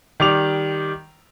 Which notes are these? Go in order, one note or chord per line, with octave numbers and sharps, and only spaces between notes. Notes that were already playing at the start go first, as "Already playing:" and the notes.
D#3 G3 D6 F7